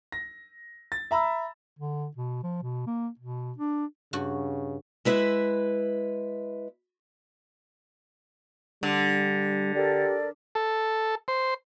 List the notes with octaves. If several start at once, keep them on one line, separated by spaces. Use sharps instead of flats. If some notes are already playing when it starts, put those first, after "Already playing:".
A#6
A6
E5 A#5 B5 E6
D3
B2
F3
B2
A#3
B2
D4
G2 C#3 F#4
G#3 E4 B4 E5
D3 G3
G4 A4 A#4 D5
A4
C5